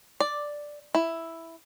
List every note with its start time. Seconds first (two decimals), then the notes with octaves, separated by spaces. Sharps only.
0.20 D5
0.95 E4